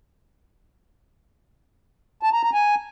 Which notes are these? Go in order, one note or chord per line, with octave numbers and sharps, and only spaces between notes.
A5
A#5
A#5
G#5